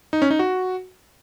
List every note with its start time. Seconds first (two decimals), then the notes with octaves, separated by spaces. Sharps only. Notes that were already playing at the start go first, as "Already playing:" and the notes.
0.13 D#4
0.22 C#4
0.31 D#4
0.39 F#4